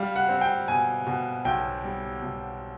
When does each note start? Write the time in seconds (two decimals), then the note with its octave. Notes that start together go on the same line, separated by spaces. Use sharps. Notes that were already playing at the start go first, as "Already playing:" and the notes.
Already playing: G3 F5
0.16 F#5
0.29 C4
0.41 G5
0.68 B2 G#5
1.07 B2
1.45 B1 G5
1.84 G3
2.22 B1